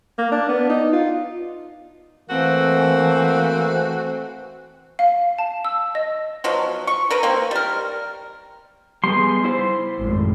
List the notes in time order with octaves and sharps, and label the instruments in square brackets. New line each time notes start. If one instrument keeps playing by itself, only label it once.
[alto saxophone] A#3
D4
B3
D#4
F4
[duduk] E3 [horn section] A3 C4 [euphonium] A#3 [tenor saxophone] F#4
[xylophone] F5
A5
E6
D#5
[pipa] B2 F3 F#3
C#6
A#4 B4 A#5
A#3 C4
G3 A#4
[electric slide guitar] G3 B3 G#4 [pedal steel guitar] C6
[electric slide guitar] E4 C5
[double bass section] G#1 F#2 A2